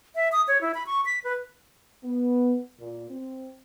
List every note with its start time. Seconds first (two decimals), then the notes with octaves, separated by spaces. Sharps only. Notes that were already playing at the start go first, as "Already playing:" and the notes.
0.16 E5
0.32 D#6
0.48 C#5
0.61 E4
0.74 B5
0.86 C#6
1.06 B6
1.24 B4
2.04 B3
2.80 A#2
3.10 C4